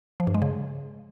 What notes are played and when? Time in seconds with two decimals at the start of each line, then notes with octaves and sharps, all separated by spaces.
0.20 F3
0.27 G2
0.34 G#3
0.42 C#3